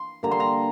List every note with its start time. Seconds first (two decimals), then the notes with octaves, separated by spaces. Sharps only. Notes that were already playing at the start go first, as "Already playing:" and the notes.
Already playing: C6
0.23 D3 G3 A#3 A#5
0.31 C6
0.40 A#5